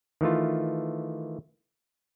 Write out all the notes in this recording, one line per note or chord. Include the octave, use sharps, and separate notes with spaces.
D#3 E3 A3 F4